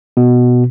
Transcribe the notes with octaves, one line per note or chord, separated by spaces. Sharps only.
B2